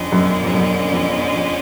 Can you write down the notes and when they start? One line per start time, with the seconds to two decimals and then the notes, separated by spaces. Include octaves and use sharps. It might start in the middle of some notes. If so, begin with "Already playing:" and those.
Already playing: F2 D3 G#3 C#4
0.12 F#2
0.43 F2
0.53 F#2
0.93 F2
1.34 F2